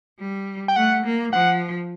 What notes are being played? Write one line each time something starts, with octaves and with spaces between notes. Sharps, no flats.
G3
G5
A3 F#5
A#3
F3 F#5